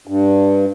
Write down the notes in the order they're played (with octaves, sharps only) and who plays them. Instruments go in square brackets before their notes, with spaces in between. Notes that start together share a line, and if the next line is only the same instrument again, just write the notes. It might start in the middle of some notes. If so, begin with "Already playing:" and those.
[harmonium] G2